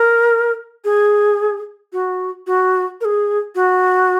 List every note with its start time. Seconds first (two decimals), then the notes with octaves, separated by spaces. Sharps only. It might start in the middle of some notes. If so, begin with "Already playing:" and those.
Already playing: A#4
0.85 G#4
1.93 F#4
2.47 F#4
3.01 A#4
3.05 G#4
3.55 F#4